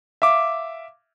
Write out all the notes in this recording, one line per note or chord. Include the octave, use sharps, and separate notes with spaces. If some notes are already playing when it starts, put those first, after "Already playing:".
E5 F5 D6